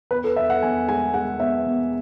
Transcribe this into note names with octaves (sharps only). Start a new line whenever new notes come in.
E2 B4
A4
E2 E5
F#5
E2 G#5
G#3 G#5
G#3 F#5
B3 E5
E2